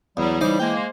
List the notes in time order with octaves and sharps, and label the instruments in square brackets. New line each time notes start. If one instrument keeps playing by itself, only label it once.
[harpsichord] E2 [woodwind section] F#3 G3
[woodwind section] C#3 G3 [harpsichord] E3 C5 D6 [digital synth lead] D#4
[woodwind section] G#3 A#3 [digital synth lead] G5
[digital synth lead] C5